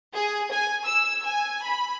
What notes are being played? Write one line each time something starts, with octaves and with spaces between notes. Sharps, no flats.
G#4
G#5
E6
G#5
B5